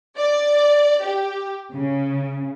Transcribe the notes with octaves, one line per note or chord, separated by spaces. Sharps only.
D5
G4
C#3